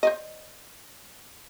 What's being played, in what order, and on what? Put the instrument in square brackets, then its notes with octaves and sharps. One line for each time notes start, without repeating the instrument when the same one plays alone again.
[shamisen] C5 D5 D#5